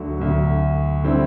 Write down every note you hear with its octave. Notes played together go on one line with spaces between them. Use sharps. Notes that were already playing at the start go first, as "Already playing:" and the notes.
Already playing: D2 D3 F#3
D2 D3 F#3
D3 G3 C4 E4